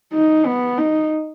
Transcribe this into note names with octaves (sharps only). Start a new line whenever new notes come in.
D#4
B3
D#4